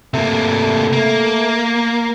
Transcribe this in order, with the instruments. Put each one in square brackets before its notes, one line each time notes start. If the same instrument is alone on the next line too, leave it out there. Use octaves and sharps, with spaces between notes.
[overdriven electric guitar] C3 A#3 [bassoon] A3
[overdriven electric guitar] A#3